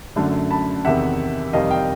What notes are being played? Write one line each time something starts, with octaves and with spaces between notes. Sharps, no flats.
F#2 D3 F#3 A3
A5 B5
E2 C3 D#3 E5 F#5
F2 C3 D#3 G3 D#5 F5
F5 G5